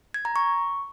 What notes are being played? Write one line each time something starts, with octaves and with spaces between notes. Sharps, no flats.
G#6
A#5
C#6